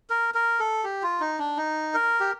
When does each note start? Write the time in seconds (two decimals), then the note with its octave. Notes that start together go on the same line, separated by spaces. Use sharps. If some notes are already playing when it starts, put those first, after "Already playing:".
0.10 A#4
0.34 A#4
0.59 A4
0.84 G4
1.03 F4
1.20 D#4
1.39 D4
1.57 D#4
1.94 A#4
2.20 G4